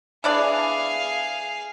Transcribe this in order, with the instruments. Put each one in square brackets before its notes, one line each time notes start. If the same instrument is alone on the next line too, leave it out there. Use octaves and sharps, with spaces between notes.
[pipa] E3 D4 D5 [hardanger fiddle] G#4 F5